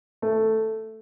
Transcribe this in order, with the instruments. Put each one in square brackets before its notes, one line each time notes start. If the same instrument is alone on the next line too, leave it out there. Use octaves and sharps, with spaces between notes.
[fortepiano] A3